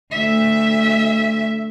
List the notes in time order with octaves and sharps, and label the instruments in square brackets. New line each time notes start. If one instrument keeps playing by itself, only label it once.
[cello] D2 E5